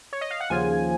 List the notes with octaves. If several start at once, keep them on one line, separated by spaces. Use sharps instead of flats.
C#5
D#5
F5
F#5
D#2 C#3 F3 G#5